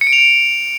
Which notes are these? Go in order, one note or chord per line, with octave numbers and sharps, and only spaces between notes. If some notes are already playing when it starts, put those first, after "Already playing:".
C#7
D7
F7
D7